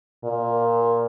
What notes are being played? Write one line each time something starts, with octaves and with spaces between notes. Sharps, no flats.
A#2